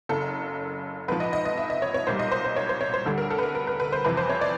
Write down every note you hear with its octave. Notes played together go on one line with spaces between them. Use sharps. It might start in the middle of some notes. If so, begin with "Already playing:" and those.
F#1 F#2 C#3 A4
A#1 G#2 F3 B4
D#5
D#5
D#5
E5
D#5
C#5
C#5
B1 A#2 G3 C5
D#5
C5
C5
C#5
C5
C#5
C5
D2 D3 G3 A4
A#4
A4
B4
A#4
A#4
B4
B4
C5
F2 C3 E3 B4
C5
C#5
D5